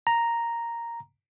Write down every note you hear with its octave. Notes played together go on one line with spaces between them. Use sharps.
A#5